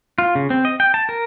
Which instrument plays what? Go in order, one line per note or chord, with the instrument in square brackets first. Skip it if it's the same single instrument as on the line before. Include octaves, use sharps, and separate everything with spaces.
[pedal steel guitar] F4
C#3
C4
D#5
G5
A5
A#4